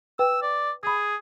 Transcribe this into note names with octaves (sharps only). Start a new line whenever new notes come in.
B4 G5 E6
D5
G#4 B5 D#6